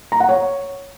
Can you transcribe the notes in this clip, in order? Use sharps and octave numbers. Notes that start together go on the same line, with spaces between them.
A#5
F#5
C#5